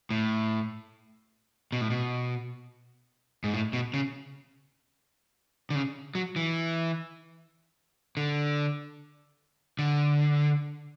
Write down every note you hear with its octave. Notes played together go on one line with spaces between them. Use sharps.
A2
B2
A2
B2
G#2
A2
B2
C#3
D3
C#3
F#3
E3
D3
D3